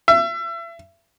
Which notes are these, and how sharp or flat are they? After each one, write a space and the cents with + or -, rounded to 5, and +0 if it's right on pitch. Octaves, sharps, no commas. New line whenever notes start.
E5 +35